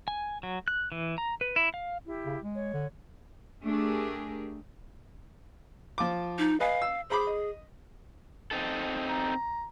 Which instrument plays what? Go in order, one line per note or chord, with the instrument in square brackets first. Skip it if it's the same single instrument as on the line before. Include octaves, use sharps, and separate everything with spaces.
[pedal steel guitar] G#5
F#3
F#6
E3
A#5
B4
E4
F5
[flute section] E4 G4
[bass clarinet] C#3
G#3
[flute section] C#5
[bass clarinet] D3
[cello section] A3 D4 G4 G#4 A#4
[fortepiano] F3 F4 D6
[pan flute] D#4
[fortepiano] B4 D#5 G#5 [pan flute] F5
[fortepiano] E6
[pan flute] G#4 [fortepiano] C5 B5 D6
[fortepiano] D#5
[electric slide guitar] C4 D#4 A4
[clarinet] A#5